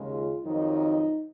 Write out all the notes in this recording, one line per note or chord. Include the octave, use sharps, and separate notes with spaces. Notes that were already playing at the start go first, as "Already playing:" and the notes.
Already playing: D#2 C#3 G#3
F4
F2 D#3 F#3 D#4